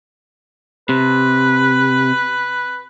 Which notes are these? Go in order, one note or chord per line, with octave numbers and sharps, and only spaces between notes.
C3 B4